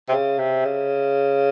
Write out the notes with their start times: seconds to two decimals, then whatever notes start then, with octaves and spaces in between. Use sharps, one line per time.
0.09 C3
0.12 C#3
0.38 C3
0.65 C#3